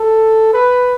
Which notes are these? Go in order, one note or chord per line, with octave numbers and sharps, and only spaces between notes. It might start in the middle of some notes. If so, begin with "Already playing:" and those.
Already playing: A4
B4